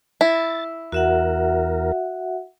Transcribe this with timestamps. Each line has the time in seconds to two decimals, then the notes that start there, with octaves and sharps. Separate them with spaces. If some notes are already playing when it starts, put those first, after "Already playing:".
0.21 E4 A6
0.92 E2 F#4 A#4 E5 F#5